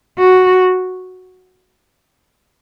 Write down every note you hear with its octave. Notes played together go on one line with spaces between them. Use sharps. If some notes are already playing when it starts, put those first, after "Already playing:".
F#4